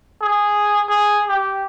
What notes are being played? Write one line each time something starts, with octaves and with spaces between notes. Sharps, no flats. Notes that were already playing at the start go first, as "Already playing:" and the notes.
G#4
G#4
G4